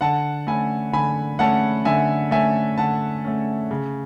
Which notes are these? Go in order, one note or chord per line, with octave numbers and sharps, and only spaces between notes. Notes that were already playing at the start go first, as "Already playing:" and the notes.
D3 F#5 A5
A3 C#4 G#5 B5
D3 G#5 B5
A3 C#4 F#5 A5
D3 E5 G#5
A3 C#4 E5 G#5
D3 F#5 A5
A3 C#4
C#3